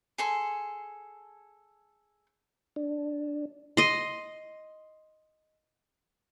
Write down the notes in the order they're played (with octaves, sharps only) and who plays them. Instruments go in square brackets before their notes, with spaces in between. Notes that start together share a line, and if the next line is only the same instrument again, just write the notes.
[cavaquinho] G#4 A4 C6
[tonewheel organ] D4
[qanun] D#5 C6